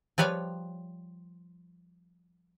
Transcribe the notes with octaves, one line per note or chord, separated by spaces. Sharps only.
F3 G3 B4 C#5 F5